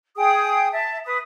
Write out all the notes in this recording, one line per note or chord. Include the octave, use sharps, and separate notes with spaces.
G#4 G5 D#6
E5 A5
B4 D#6